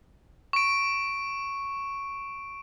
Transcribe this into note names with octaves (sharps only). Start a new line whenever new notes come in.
C#6 D7